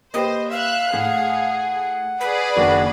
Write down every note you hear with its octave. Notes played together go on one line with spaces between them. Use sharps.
A#3 G4 B4 C5 D#5
E5 F5 F#6
A2 G#4 F#5
G#4 B4 D5 B5
F#1 D#3 A#3 D4 F#4